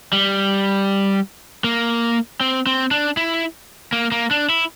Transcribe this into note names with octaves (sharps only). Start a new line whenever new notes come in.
G3
A#3
C4
C4
D4
E4
A#3
A#3
D4
E4